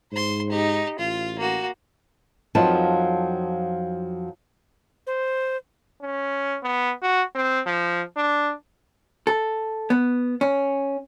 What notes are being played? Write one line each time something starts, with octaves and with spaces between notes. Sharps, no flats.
G#2 C5 C6
D#4 G4
A1 F4
A#3 F#4
F2 F3 F#3 D#4 B4 A5
C5
C#4
B3
F#4
C4
F3
D4
A4
B3
C#4